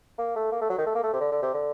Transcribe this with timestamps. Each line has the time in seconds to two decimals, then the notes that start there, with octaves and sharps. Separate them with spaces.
0.18 A#3
0.36 A3
0.52 A#3
0.61 A3
0.69 F#3
0.78 D#3
0.86 A3
0.95 A#3
1.03 A3
1.13 C3
1.20 D3
1.31 D3
1.42 C3
1.54 D3